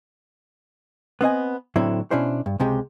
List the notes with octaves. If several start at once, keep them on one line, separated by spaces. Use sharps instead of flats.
B3 C4 D#5 G#5
A2 D3 F#3 C4 E4
B2 C#4 D4 E4 C5
G2
C#2 C3 G#3 G4